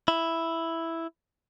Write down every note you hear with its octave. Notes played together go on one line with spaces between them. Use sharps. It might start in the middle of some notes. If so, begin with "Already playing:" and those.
E4